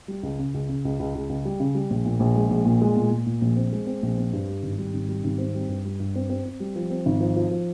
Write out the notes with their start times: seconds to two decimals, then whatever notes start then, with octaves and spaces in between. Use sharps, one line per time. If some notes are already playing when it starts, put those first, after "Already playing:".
0.08 G3
0.23 C#2
0.39 C#3
0.54 C#2
0.69 C#3
0.85 C#2
0.99 C#2
1.15 C#2
1.29 C#2
1.45 G3
1.60 C#3
1.75 G3
1.90 A#1
2.06 A#2
2.20 A#1
2.35 G#3
2.50 A#1
2.66 A#2
2.82 G#3
2.97 A#2
3.11 A#2
3.26 A#2
3.42 A#1
3.56 C4
3.72 G#3
3.87 C4
4.03 A#1
4.18 C4
4.33 G2
4.48 G3
4.63 G#1
4.78 G3
4.94 G#1
5.09 G3
5.24 G#1
5.38 C4
5.55 G3
5.69 G2
5.85 G3
6.00 G2
6.15 C4
6.30 C4
6.45 C4
6.60 G3
6.76 F3
6.90 C4
7.06 G#1
7.20 F3
7.36 F3
7.51 F3